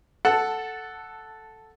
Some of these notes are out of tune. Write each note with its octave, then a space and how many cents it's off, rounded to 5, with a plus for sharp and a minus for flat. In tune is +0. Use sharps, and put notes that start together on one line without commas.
A4 +0 F#5 +0 A5 +10